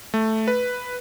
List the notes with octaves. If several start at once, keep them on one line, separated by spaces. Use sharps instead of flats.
A3
B4